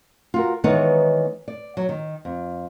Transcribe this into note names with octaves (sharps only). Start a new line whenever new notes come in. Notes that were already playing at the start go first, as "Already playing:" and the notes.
F4 F#4 A#4
D#3 E3 G#3 B3 D#4 C#5
D5
F#3
D#3
F2